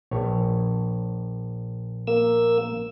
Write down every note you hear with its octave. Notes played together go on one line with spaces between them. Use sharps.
A#1 C#5
A#3 E6